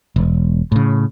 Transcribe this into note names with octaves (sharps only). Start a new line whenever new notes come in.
E1
A2 C#3